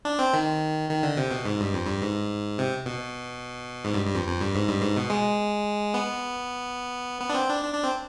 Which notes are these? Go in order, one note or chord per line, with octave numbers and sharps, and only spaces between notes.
D4
C4
D#3
D#3
D3
C3
B2
G#2
G2
F2
G2
G#2
C3
B2
G#2
G2
G2
F2
F2
G2
G#2
G2
G#2
B2
G#3
B3
B3
D4
C4
D4
D4
D4
C4